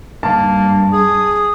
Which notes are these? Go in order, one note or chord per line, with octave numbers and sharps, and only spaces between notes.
G2 A#3 A5
G#4 D#6